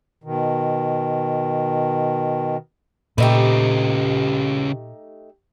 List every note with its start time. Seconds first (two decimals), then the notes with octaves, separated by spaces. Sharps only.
0.24 B2 D#3
3.18 A#2 C#3 A3 D#4 G4 B4